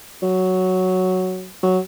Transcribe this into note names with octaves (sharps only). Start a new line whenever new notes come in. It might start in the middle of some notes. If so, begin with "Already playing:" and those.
F#3
F#3